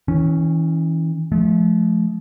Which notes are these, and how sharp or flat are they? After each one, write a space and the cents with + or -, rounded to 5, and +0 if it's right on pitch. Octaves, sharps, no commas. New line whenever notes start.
E3 -35 C#4 +0
F3 +0 A3 -40